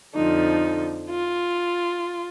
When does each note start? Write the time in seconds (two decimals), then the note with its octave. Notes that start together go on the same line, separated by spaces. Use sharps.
0.15 F2 D3 F3 D#4
1.09 F4